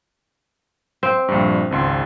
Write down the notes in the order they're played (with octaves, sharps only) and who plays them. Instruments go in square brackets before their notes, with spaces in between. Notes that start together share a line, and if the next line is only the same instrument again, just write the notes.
[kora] C4
[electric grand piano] A#1 G2
G#1 C#2 C6